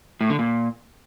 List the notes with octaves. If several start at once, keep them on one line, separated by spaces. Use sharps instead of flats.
A2
D3
A#2